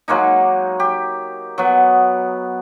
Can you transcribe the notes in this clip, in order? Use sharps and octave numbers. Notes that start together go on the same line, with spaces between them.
F#3 G#3 A#3 D#4
G4
F#3 B3